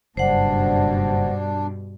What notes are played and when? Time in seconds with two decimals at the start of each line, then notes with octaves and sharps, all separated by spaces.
0.17 F#1 G2 B2 D4 C5 F#5